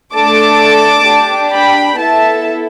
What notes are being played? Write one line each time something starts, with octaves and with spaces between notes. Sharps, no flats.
A3 D4 A4 A5 D6
D4 G4
G5 B5
B3 E4 A4 E5 A5